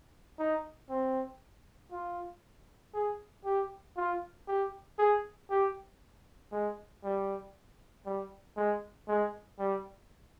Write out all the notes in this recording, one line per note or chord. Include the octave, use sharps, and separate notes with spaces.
D#4
C4
F4
G#4
G4
F4
G4
G#4
G4
G#3
G3
G3
G#3
G#3
G3